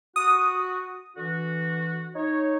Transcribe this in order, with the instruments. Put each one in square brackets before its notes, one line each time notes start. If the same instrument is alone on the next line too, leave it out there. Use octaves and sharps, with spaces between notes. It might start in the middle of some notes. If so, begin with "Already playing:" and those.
[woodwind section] F#4 [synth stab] D#6
[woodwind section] D3 E3 F#4
D#4 C#5